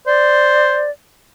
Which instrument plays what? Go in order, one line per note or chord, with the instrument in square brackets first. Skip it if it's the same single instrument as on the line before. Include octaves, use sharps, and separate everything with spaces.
[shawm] C5 [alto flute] D5